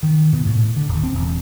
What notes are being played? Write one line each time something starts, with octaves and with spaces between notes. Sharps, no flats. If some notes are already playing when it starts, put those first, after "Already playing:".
D#3
B2
A2
D3
D#1
C4
E1